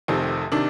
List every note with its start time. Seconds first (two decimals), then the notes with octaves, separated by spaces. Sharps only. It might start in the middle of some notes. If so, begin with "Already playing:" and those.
0.08 F1 F2 C3 D#3 C4
0.52 C3 D#3 D4